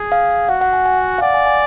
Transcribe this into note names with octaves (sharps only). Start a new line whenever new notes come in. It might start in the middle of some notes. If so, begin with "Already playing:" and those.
Already playing: G#4
F5
F#4 F#5
F#5
G#5
G#5
F5
D5 F#5
G#5
G#5